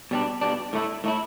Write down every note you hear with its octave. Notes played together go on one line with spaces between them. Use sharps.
B2 G3 D4
B2 G3 D4
A2 A3 E4
A2 A3 E4